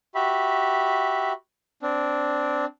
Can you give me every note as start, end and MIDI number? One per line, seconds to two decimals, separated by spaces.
0.15 1.33 66
0.15 1.33 67
0.15 1.33 76
0.15 1.33 83
1.82 2.65 60
1.82 2.65 62